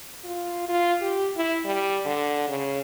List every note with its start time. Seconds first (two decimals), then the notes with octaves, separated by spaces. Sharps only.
0.24 F4
0.68 F4
1.01 G4
1.36 E4
1.65 G3
2.06 D3
2.48 C#3